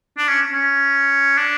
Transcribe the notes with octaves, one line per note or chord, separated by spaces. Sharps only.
D4
C#4
C#4
D4